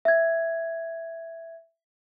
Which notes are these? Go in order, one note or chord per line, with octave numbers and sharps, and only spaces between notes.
E5 G#6